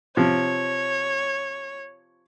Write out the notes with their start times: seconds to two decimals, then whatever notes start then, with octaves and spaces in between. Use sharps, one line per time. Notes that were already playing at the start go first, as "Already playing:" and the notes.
0.17 C3 F3 C#5